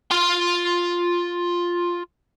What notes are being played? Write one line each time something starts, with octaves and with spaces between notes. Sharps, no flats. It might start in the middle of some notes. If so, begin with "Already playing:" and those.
F4 C6